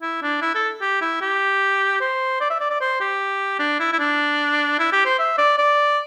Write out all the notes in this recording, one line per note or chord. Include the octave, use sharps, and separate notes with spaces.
E4
D4
E4
A4
G4
E4
G4
C5
D5
E5
D5
D5
C5
G4
D4
E4
E4
D4
E4
G4
C5
E5
D5
D5